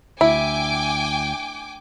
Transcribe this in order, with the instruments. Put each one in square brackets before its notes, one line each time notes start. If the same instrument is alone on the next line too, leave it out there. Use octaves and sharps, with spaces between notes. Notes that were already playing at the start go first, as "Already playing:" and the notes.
[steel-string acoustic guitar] D2 [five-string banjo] E4 [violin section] G5 G#5 D6